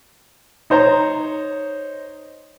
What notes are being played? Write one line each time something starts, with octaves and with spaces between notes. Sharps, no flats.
D#4 C5 C#5 A#5